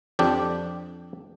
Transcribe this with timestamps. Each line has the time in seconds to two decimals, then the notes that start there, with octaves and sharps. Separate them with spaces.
0.19 F2 D4 G4